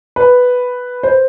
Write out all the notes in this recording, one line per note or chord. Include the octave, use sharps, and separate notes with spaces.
B4
C5